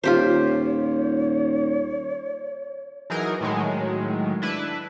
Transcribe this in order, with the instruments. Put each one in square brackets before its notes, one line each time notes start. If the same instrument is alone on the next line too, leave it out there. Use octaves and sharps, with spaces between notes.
[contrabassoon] D#1 [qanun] F4 G4 C5 [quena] C#5
[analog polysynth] E3 F#3 D#4 G#4 A#4
A2 D#3 F#3 G#3
D4 E4 B4